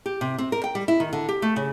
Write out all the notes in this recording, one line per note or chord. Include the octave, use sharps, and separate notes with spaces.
G4
C3
C4
A#4
G5
G3
E4
D#3
D3
G4
A3
C#3